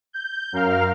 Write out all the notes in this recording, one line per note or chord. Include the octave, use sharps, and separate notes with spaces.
G6
F#2 A#4 F5 F6